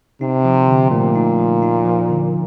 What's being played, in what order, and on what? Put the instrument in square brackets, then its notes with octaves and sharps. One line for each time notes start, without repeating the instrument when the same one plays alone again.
[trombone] C3 [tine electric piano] D#4
[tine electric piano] F3
D3
[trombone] A#2 [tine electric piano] A3
[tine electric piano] D#4
F3
D#4
F3
D3